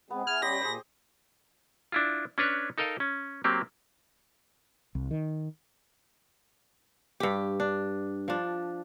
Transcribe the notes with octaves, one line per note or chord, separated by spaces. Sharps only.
G#3 B3 C4 G#4
E4 G#4 G#5 F6
G3 C#4 G4 C#5 D#5 B5 C6 A#6
A#2 G#4 C5
D4 E4 F4
C#4 D4 B4 C#5
D#4 A4 A#4 D#5 F5
C#4
F#3 A#3 C4 G4
C2
D#3
G2 G4
D4
F3 D4